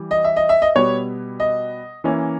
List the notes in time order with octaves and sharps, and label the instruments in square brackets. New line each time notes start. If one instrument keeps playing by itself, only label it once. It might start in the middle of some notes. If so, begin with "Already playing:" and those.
Already playing: [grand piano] E3 G3
D#5
E5
D#5
E5
D#5
B2 G3 B3 C#5
D#5
E3 A#3 C#4